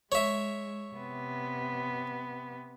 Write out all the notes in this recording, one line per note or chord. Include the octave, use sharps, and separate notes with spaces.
G#3 C#5 E5
C3 B3